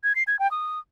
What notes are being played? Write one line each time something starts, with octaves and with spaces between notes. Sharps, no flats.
G#6
C7
G#6
G5
D#6